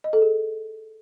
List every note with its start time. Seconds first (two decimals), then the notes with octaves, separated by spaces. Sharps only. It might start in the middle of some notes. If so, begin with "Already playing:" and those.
0.04 D#5
0.13 A4
0.22 G#4